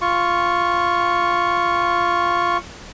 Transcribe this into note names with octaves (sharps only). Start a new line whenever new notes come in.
F4 C#6